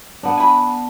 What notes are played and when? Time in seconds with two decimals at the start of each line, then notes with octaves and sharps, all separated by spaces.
0.23 B3 D4
0.37 G#5 B5